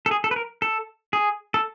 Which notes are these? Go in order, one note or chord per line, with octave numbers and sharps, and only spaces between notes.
A4
G#4
A4
B4
A#4
A4
G#4
A4